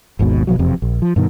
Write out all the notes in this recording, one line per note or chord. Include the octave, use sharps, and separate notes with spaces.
G#1 D#2 G#2 B2
G1 B2 F3 F#3
E1 F2 C3
A#1
F3
G2 B2 D#3